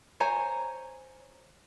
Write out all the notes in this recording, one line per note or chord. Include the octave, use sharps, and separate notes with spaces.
C5 C#5 G#5 A#5